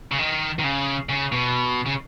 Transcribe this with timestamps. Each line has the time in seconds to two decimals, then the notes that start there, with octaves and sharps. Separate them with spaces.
0.12 C#3
0.18 D#3
0.59 D#3
0.64 C#3
1.09 C#3
1.32 B2
1.86 C#3